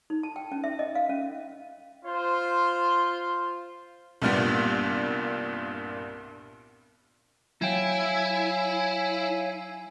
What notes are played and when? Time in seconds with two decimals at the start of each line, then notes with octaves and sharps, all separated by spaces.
0.10 D#4
0.23 A5
0.36 G5
0.52 C#4
0.64 E5
0.79 D#5
0.95 F5
1.09 C#4
2.04 F4 C5
4.22 C2 G2 A#2 G3 B3
7.62 F#3 E4 C#5 F5 G5 G#5